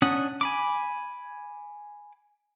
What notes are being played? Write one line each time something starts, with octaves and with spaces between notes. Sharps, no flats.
C#4 D4 F#5 D#6
G#5 B5 D6